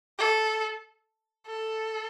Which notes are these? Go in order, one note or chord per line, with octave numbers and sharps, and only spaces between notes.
A4
A4